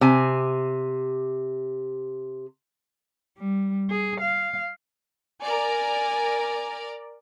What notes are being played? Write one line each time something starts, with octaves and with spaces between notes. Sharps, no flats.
C3 G#5
G3
G#4
F5
A#4 D5 G#5